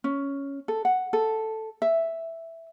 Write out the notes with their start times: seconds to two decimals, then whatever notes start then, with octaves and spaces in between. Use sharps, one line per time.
0.04 C#4
0.68 A4
0.85 F#5
1.13 A4
1.82 E5